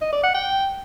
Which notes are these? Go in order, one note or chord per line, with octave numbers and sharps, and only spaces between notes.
D#5
D5
F#5
G5